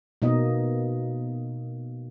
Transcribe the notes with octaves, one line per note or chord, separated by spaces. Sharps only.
B2 A#3 D#4 D#5